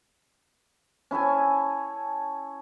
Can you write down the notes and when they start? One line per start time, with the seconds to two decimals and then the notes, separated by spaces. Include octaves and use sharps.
1.11 C#4 E4 A4 G#5